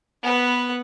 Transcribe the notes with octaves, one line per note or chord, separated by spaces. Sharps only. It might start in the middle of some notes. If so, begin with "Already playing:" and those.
B3 B4